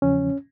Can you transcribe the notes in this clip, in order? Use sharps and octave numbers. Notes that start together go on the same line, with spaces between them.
E2 C#3 F3 C#4